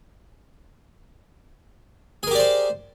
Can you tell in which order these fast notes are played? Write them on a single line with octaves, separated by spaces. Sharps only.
G#4 A#4 G4 D5 C5